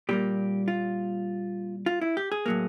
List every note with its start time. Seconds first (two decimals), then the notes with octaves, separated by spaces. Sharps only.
0.09 A#2 G3 A#3 G4
0.68 F4
1.86 F4
2.01 E4
2.17 G4
2.32 G#4
2.46 A2 F#3 A#3